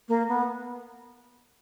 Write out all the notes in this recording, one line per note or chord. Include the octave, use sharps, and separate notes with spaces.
A#3
B3